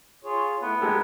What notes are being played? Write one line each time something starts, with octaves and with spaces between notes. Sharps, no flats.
F4 G#4 C#5
A3 B3 E4 A4
G#3 D#4 G4 A4 A#4